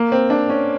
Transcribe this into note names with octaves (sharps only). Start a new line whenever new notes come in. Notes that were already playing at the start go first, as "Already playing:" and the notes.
Already playing: A#3
C4
D4
C#4